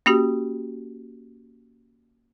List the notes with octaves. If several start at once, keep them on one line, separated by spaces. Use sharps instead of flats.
A#3 C#4 F#4 G4